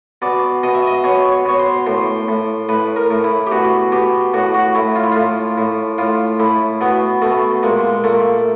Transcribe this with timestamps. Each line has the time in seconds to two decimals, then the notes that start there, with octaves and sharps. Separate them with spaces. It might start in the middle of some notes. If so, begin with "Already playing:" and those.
0.22 B2 D5
0.63 B2 D#5
0.75 E5
0.87 D#5
1.04 B2 C#5
1.32 C#5
1.45 B2 C#5
1.59 C5
1.87 A2 C5
2.28 A2
2.69 A2 B4
2.96 A#4
3.10 A2
3.24 E4
3.47 G4
3.52 B2 F#4
3.92 B2 G4
4.34 A2 F#4
4.54 F#4
4.75 A2 E4
4.96 F4
5.04 E4
5.12 A2 F4
5.57 A2
5.98 A2 F4
6.39 A2 E4
6.81 B2 B3
7.22 B2 A3
7.63 A#2 G#3
8.04 A#2 A3